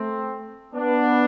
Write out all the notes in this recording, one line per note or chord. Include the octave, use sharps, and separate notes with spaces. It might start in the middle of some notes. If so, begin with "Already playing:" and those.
Already playing: A3 C4
B3 D4